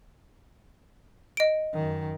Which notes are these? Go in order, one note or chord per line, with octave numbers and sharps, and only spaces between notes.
D#5 D7
F#2 D#3